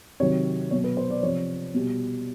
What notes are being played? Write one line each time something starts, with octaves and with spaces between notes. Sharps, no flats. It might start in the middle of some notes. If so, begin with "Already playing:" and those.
C3 D#3 F#3 C#5
B2 F#3 C#5
B4
C5
D5
C3 F3 C#5
B2 G3